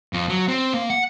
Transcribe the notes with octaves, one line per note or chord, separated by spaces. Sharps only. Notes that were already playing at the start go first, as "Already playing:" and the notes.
F2
F#3
C4
A#3
F#5